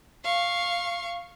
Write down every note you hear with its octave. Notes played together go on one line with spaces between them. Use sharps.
F5 C#6